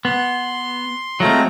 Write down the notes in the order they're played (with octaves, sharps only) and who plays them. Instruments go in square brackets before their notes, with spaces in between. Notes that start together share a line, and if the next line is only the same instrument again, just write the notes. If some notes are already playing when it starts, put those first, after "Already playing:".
[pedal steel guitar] B3 [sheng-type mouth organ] C6
[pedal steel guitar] F#3 G#3 C4 [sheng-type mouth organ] A3 F4 A#5